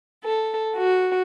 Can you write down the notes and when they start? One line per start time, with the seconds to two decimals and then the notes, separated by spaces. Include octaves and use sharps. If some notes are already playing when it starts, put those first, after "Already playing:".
0.24 A4
0.76 F#4